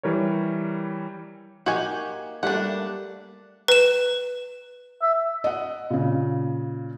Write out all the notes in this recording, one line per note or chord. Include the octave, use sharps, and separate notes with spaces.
E3 G3 A#4 C#5
A#3 D#4 F#4 G4 G#5
G3 A3 A#3 D4 F#5
B4 E7
E5
D#5 F#5
A#2 C#3